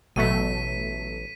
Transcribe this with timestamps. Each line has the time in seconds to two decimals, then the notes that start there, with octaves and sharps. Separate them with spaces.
0.16 A1 B2 F#3 A3 B6 D#7